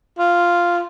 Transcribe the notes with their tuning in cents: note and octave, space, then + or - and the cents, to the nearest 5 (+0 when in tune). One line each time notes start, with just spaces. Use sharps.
F4 -5